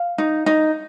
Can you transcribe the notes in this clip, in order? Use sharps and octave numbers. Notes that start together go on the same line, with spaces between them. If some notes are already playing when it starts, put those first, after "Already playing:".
Already playing: F5
D#4
D#4